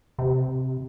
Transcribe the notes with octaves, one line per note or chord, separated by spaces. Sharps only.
C3